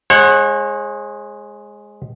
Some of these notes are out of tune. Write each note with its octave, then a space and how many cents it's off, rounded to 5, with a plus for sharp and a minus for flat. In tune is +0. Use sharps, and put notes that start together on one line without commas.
G#3 +0 C#5 -45 F#5 -5